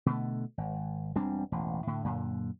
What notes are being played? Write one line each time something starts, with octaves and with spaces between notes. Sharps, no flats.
B2 D3 A3
G#1
E1 G3 C4 D4
E1 A1
A2 D3
F#2 A#2 D3